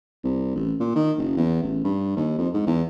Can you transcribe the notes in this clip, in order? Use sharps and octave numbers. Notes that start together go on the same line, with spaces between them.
C2
A1
A#2
D#3
F#1
E2
A1
G2
D#2
F2
G#2
E2